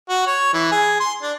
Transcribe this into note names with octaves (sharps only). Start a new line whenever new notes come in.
F#4
C#5
E3
G#4
C6
D4